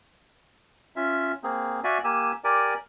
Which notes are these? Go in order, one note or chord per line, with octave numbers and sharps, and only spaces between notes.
C#4 F4 E5
A#3 C4 G#4
F#4 D5 E5 F5 G#5
A#3 G4 G#5 E6
G4 A#4 D5 G#5